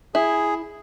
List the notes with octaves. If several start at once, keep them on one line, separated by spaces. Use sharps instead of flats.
E4 G#4